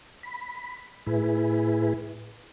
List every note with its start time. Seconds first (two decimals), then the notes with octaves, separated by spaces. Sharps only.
0.23 B5
1.06 A2 E4 G#4 B4